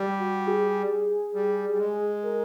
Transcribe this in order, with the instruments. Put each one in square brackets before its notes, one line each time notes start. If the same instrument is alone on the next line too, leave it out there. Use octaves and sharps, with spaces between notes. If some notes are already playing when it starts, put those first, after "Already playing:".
Already playing: [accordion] G3
[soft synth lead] F#4
G#4
[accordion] G3
G3
G#3
[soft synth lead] A#4